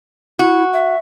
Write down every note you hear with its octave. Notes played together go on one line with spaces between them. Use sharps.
E4 F#4
E5